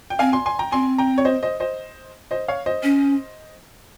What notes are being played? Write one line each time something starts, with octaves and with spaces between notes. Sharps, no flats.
G5
C4 F5 G#5
G#5 C6
G#5 C6
G5 A#5
C4 G#5 C6
G5 A#5
C#5
C5 D#5
C5 D#5
C5 D#5
C5 D#5
C#5 F5
C5 D#5
C#4